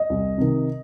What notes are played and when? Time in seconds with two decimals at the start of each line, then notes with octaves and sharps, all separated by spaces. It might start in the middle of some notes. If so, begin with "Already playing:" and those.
Already playing: D#5
0.10 C2
0.38 C3 D#3